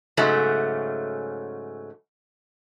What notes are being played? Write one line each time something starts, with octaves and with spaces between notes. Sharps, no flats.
G#2 C#3 F#3 A3 C#4